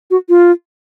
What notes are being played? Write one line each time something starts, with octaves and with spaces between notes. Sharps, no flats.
F#4
F4